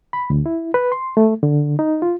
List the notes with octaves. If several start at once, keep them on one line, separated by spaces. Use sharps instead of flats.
B5
D2
E4
B4
C6
A3
D3
D#4
F4